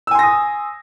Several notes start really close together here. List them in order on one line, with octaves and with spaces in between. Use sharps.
E6 G#5 C6 A#6 D#6